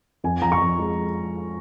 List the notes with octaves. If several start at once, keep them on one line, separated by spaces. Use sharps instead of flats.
F2 G#5
F3 A#5
C#6
F2
G#3